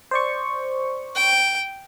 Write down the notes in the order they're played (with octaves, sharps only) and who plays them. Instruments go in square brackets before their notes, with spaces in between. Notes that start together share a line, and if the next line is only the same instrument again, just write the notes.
[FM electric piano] C5 D5 C#6
[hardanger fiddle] G5